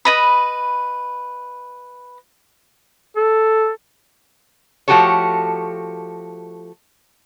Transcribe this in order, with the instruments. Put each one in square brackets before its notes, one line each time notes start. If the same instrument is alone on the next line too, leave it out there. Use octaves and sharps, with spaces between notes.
[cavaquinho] B4 D#5 B5
[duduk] A4
[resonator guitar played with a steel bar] F3 A3 F#4 G4 A4 C#5